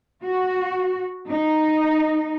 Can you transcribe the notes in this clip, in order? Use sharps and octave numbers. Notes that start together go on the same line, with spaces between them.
F#4
D#4